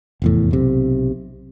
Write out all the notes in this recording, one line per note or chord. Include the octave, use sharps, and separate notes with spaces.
F1 E2 A2
B1 C3